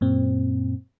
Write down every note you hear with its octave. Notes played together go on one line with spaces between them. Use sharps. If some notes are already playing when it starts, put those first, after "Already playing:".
F#2 A#2 C4